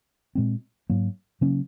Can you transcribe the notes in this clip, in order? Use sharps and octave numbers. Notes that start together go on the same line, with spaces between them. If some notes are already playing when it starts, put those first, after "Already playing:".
A#2 G#3 C4
G#2 F#3 A#3
C#3 F#3 A#3 C#4